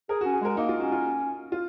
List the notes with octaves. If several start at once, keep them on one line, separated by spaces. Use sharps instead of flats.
G#4 A#4
F#4
C#4
G#4
G#3 A#4
A#3 D#4
F4
C#4 F#4
F4
F4